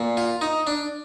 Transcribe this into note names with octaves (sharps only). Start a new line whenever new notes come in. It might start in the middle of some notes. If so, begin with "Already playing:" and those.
Already playing: A#2
F4
D#4
D4